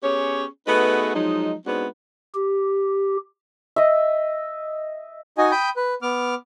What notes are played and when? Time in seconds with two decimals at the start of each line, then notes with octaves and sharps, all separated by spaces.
0.04 B3 C#4 G4 G#4 C#5
0.67 A3 B3 D#4 F#4 G#4 B4
1.15 F3 F#3 G#3 D#4
1.66 G#3 B3 C4 D4 D#4 F#4
2.35 G4
3.76 D#5 E5
5.38 D#4 F#4 D#5 G#5
5.51 G5 B5 D#6 G6
5.76 B4
6.02 B3 D6 F6